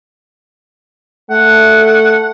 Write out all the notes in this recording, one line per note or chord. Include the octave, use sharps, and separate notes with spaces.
A3 F#5